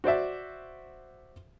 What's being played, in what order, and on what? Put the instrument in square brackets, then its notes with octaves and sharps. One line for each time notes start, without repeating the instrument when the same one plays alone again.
[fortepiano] F#4 C5 D5 E5